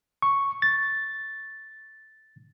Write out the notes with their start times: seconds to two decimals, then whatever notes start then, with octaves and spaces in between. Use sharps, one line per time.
0.22 C#6
0.62 A6